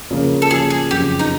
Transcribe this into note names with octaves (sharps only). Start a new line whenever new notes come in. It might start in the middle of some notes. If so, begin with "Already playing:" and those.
C#3 F3 A#3
A4
C#3 F3 A#3 G#4
G#4
F#1 F2 C#3 F3 G4
D#4